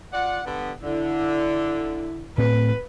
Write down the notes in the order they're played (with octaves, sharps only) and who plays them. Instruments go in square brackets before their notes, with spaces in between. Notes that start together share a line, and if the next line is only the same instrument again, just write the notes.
[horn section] F4 D5 F#5
D3 G3 B3
[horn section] D3 [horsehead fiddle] E4
[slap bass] A2 C4 [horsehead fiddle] B4